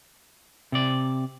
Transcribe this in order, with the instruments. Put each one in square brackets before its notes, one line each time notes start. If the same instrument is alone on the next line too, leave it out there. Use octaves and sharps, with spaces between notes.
[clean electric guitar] C3 D5